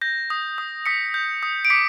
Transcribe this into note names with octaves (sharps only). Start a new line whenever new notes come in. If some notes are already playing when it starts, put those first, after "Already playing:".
G6 A#6
D#6
D#6
D#6 B6 C#7
G6
D#6
D7
D6 B6 C#7